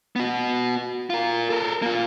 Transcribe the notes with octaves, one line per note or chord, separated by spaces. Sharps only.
B3 F#4
F4 A#4
A4 A#4
A#3 F4